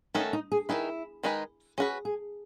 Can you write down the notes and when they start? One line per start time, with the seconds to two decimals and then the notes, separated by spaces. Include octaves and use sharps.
0.14 D#3 A3 C#4 D#4 F#4 A4
0.33 D#4
0.52 G#4
0.69 D#3 G#3 D#4 E4 G#4 B4
1.23 D#3 G#3 D#4 G#4 B4
1.78 C#4 F#4 G#4 B4
2.05 G#4